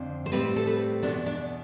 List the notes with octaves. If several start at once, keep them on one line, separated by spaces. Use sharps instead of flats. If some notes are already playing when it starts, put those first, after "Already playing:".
Already playing: F2 D3 F3 C4
C5
A2 G3 C4 B4
A4
B4
E2 B2 B3 D4
D4